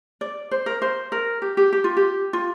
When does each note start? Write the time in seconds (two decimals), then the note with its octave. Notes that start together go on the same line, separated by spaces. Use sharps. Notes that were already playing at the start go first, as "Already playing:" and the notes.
0.21 D5
0.51 C5
0.66 A#4
0.82 C5
1.12 A#4
1.42 G4
1.57 G4
1.73 G4
1.84 F4
1.97 G4
2.33 F4